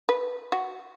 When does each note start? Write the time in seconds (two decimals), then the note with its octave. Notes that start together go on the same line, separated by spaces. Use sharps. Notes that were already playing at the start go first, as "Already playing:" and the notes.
0.09 B4
0.52 F#4